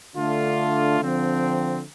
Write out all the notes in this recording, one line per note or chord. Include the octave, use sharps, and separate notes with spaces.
D3 A3 D4 F4
D3 F3 C4